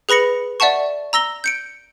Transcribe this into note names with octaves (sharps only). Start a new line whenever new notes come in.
G#4 B4 B5 A#6 C#7
D5 E5 F#5 A5 C#6
A#5 E6 A#6 G7
G6 C#7 D7